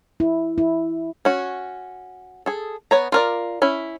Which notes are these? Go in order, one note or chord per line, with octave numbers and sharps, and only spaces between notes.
E4
E4
C#4 F#4
G#4 A4
B3 C#5 A#5
F4 A#4 D5
C#4 E4